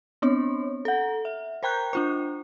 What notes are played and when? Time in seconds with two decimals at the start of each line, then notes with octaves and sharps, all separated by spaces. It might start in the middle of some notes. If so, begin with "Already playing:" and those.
0.22 B3 C4 D4 C#5
0.85 A4 F#5
1.25 E5
1.63 A#4 C5 G5 A#5 F#6 G6
1.93 D4 F4 C5